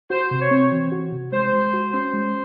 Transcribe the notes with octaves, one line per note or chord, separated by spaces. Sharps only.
F#4 C5
C3
C#5
C4
E3
F#4
C3
G#3 C5
G#3
F#4
C#4 C5
G#3